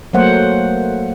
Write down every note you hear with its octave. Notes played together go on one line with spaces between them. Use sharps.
F#3 A3 A#3 C5 F#5